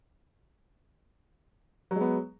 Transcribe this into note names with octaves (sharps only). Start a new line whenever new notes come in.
F#3 G#3 B3